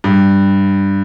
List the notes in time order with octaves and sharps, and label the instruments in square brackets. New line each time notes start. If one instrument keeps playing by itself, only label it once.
[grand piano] G2